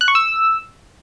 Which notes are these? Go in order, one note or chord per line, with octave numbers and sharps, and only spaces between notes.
F#6
C#6
E6